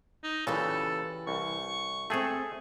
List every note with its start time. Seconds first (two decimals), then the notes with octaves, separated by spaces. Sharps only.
0.23 D#4
0.47 A#2 C#3 E3 G4 A4 B4
1.27 C2 C#6
2.10 A3 C4 G#4 A4 E5 G5